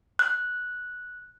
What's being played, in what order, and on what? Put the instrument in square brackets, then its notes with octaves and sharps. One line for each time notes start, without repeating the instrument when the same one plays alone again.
[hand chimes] F#6